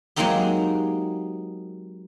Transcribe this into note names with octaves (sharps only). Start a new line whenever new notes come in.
F#3 G#3 A#3 C4 D#4 G4